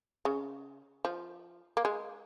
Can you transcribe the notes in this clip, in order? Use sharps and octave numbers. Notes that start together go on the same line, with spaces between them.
C#3
F3
A#3
G#3